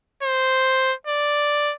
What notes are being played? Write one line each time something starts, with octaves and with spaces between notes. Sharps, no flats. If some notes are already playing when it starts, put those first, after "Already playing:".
C5
D5